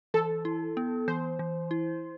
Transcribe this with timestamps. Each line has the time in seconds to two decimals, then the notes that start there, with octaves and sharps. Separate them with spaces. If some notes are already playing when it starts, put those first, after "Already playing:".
0.14 E3 A4
0.45 E4
0.77 B3
1.08 E3 C5
1.39 E3
1.71 E4